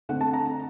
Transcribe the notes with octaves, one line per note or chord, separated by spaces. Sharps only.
D3 A3 C4 F#5
A5
A#5